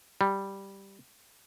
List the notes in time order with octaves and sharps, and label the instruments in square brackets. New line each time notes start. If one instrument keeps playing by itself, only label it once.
[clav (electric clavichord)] G3